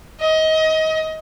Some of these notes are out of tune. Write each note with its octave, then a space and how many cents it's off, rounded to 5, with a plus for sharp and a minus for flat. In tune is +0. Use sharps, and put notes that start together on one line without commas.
D#5 +25